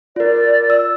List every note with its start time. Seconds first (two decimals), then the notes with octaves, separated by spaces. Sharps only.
0.16 F4 A#4 D5
0.70 E6